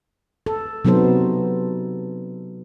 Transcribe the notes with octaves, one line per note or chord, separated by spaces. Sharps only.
A4
C3 F#3 B3 D#4 A4 C5